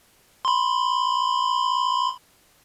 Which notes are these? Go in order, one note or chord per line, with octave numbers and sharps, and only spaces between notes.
B5 C6